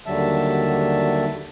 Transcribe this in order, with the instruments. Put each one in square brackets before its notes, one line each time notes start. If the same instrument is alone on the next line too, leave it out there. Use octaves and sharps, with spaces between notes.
[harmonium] D#2 D3 F#3 G3 E5 A5